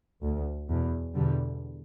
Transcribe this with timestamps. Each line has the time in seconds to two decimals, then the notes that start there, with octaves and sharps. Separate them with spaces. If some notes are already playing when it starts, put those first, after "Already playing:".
0.23 D2
0.69 E2 B2
1.15 E2 B2 D3 G3